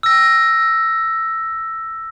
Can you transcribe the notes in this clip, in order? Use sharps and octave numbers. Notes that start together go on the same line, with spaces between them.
E6 A#6